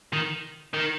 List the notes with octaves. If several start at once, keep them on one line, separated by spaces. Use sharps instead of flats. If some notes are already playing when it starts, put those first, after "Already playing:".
D#3
D#3